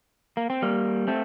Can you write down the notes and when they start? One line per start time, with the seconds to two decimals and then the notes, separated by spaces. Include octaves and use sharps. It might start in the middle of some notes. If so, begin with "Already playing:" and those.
0.37 A#3
0.50 C4
0.62 G3 A#3
1.08 A3 C4